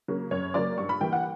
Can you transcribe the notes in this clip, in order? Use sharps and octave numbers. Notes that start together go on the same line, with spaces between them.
C#3 F#3 A#3
F#2 C#5
C#3 F#3 A#3 D5
G2 C#6
B5
E3 G3 A#3 G5
F#5